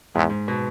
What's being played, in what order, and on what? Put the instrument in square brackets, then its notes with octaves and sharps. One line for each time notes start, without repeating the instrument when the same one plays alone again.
[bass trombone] E2 [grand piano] G#2
[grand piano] G#2
B2